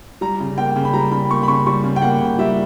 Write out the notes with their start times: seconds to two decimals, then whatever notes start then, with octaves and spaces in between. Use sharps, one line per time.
0.21 G3 A#5
0.40 C#3
0.58 A#3 G5
0.76 C#3
0.85 B5
0.93 G3 A#5
1.12 C#3 B5
1.29 A#3 C#6
1.43 B5
1.48 C#3 C#6
1.66 G3 C#6
1.84 C#3
1.96 G5
2.02 A#3 F#5
2.21 C#3
2.39 G3 E5